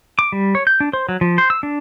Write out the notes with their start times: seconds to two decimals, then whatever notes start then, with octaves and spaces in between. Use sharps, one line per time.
0.19 D6
0.32 G3
0.55 C#5
0.67 G6
0.80 D4
0.93 C5
1.09 F#3
1.21 F3
1.38 C5
1.50 E6
1.63 D4